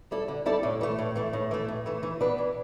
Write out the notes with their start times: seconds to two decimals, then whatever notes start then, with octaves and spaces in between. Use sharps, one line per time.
0.11 G3 E4 A4 D5
0.28 D3
0.46 G3 E4 A4 D5
0.63 A2
0.81 E3 A3
0.99 A2
1.16 E3 A3
1.33 A2
1.51 E3 A3
1.68 A2
1.86 E3 A3
2.03 E3
2.21 B3 D4 B4
2.38 E3